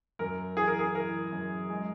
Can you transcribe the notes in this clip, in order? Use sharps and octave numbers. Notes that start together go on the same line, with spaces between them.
F#2 A#4
E3 G#4
A#4
G#4
E3 A#4
F#2
G#3